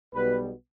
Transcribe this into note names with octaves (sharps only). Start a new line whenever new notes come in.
B1 B2 G3 B3 B4